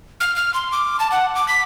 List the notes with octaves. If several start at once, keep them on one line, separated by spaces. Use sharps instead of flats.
F6
F6
C6
D6
A5
F#5
D6
B6